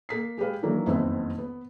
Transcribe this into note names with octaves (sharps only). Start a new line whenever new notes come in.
A#3 B6 C7
G#3 G4 G#4 B4 F5
D#3 E3 F#3 A#3 D4
F#1 F2 D#3 B3 C4 E5
B3